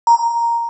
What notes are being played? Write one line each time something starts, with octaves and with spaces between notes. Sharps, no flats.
A#5